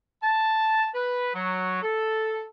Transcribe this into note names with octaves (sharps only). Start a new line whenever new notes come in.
A5
B4
F#3
A4